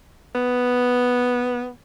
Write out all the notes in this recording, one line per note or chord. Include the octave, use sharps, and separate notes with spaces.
B3